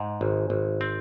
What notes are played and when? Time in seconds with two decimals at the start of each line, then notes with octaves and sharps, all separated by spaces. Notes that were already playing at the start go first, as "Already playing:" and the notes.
Already playing: G#2
0.21 G#1
0.50 G#1
0.81 C4